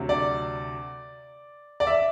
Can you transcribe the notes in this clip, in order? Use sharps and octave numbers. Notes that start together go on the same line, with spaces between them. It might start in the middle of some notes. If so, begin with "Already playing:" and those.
Already playing: D2 C3 F#3
D5
D5
E5